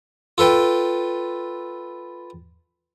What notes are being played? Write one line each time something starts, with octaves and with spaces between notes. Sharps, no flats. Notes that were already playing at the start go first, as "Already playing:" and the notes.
F4 A4 B4 G5